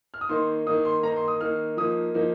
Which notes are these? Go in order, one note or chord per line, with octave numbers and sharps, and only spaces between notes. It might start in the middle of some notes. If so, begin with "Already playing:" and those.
F6
D#6
D#3 A#3 D#4 C6
D#3 A#3 D#4 D#6
C6
D#3 A#3 D#4 A#5
C6
D#6
D#3 A#3 D#4 F6
F3 A#3 D#4 D#6
F3 A#3 D#4